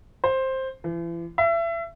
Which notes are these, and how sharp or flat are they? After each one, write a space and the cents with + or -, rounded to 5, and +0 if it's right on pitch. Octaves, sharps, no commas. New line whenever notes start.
C5 +10
E3 +40
E5 +30